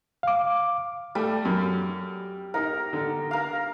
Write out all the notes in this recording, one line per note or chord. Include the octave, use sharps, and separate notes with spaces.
F5 D6
G3 A3
F#2
D#4 A#4
D3
A#4 F5